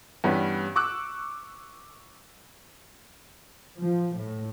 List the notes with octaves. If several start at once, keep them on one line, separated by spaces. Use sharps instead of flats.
G2 E3 G3 B3 C#4
C#6 D6 E6 F#6
F3
A2